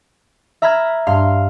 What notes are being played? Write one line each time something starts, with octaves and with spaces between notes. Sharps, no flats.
E5 A#5 B5 F6 G#6
G2 F5 C6